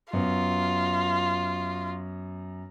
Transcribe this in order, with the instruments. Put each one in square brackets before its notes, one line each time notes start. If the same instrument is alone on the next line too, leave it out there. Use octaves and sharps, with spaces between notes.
[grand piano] F#2 B3 [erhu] F4